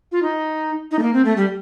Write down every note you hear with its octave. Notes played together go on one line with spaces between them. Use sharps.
F4
D#4
D#4
A3
A#3
C4
A3
G3